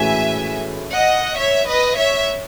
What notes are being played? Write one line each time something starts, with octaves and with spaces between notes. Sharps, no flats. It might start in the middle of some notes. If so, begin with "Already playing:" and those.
Already playing: A2 E3 G#3 C#4 F#4 E5 G#5
D#5 F#5
C#5 E5
B4 D#5
C#5 E5